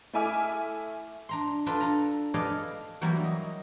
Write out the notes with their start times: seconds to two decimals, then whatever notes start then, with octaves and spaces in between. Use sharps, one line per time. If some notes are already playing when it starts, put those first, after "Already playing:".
0.13 A3 E4 E5 G#5 D6 F6
1.29 D4 A#5 C6
1.66 D4 F4 A4 B4 A5
1.80 A4 A#5
2.34 A4 B4 D5 D#5 F5 G#5
3.01 E3 F#3 G3 A#3 E4 F#4
3.24 D#5